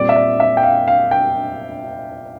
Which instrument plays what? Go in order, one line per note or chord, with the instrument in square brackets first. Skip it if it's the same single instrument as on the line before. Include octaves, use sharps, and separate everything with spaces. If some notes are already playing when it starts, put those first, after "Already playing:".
Already playing: [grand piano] A#2 G3 C4 D5
E5
D5
E5
G5
F5
F5
G5